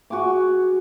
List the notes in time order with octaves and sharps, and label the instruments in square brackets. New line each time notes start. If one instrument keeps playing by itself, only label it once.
[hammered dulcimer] F#4 G#4 C#6 D6